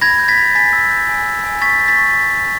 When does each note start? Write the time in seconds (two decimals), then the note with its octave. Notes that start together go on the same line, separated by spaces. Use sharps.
0.01 B5 G#6 A#6
0.20 G6
0.28 A6 B6
0.38 B5
0.55 G#5 A6 B6
0.73 E6
0.91 G6
1.09 G#5
1.26 E6
1.44 G#5
1.61 C#6 A6 B6
1.79 G6
1.88 A6 B6
1.97 C#6